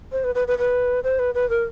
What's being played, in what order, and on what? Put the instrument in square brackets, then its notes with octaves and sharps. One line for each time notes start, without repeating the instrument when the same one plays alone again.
[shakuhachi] C5
B4
B4
B4
B4
C5
B4
B4
A#4